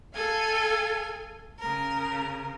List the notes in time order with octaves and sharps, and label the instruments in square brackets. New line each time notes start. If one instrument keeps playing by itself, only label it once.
[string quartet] A4 F5 G#5
C#3 A#4